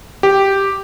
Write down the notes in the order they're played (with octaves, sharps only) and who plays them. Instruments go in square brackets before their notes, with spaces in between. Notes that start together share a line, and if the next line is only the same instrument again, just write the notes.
[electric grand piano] G4